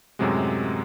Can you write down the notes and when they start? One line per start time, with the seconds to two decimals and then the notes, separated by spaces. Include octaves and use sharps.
0.19 F#2 A2 C3 F#3 G#3